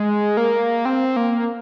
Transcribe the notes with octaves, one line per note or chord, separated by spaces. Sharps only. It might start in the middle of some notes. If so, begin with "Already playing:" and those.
Already playing: G#3
A#3
C4
A#3